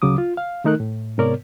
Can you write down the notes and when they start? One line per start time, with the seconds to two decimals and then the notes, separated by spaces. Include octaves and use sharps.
0.02 D2 C#3 F#3 D6 D#6
0.18 F4
0.37 F5
0.64 D#3 A3 D#4 A#4 F#6
0.80 A2
1.18 G#2 C3 B3 A#4 C#5 D5